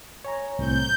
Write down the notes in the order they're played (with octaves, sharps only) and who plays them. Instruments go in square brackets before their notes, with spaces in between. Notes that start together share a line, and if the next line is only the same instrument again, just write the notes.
[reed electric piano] C#5 G#5 A#5
[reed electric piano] C2 A2 C4 [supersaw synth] G6